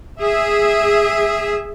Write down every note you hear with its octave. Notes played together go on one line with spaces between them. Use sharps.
G#4 E5